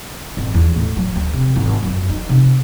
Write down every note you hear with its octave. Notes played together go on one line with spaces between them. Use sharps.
G#1
E2
A2
F#3
D2
C3
G#1
F#2
D#4
C3